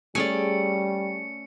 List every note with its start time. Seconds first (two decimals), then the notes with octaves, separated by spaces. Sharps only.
0.15 G3 A3 C#4 G#4 D5 C#7